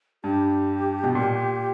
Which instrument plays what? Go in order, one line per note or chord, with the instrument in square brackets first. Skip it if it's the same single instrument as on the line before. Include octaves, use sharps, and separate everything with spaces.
[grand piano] G2 [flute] G4
[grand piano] B2
A#2